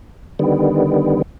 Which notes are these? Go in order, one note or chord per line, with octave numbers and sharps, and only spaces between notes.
D3 D#3 G3 B3